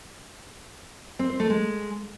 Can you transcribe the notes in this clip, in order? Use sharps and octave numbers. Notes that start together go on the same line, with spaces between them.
C4
C5
A3
G#3